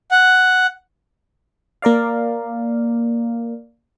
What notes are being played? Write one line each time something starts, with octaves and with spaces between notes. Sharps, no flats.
F#5
A#3 A#4 D5 F5